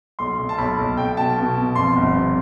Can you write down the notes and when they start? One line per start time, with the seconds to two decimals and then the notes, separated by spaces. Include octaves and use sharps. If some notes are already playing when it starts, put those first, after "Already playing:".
0.19 B1 C6
0.39 B1
0.49 A5
0.58 B1 B5
0.78 B1
0.97 B1 G5
1.17 B2 A5
1.37 B2
1.57 B2
1.75 F2 C6
1.96 G1
2.15 C3